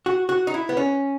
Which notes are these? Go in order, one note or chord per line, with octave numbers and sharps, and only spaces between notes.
F#4
F#4
D#4
E4
B3
C#4